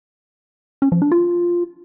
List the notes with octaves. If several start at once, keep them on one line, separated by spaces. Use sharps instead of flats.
C#4
F3
D4
F4